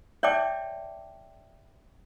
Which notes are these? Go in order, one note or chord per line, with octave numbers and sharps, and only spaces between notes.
C#5 D5 E5 G5 A5 D6